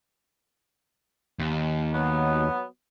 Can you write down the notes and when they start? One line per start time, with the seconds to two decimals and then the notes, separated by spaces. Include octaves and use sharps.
1.39 D#2
1.94 F#3 B3